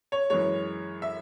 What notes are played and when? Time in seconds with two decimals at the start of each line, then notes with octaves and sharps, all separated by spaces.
0.12 C#5
0.30 F#2 E3 G#3 C#5
1.02 E5